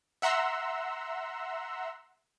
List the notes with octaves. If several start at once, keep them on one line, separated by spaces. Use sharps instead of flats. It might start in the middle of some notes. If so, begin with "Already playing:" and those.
E5 F#5 A#5 C6 E6